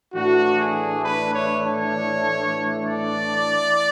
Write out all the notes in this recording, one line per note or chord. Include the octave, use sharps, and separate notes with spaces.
A2 E3 A3 D4 F#4
G#4
B4
C#5
C#5
D5